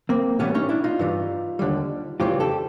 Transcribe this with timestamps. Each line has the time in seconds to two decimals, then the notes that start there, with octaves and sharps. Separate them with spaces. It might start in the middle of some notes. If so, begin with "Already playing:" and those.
0.09 A#3 C4
0.39 A2 E3 G3 B3 C#4
0.54 C#4 D#4
0.69 D4 E4
0.84 D#4 F4
0.99 G2 E3 G3
1.59 D#2 D3 G3
2.20 F2 C#3 E3 G3 F4 G4
2.40 G4 A4